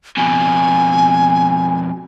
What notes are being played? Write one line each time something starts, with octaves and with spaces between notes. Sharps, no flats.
F2 B2 G#5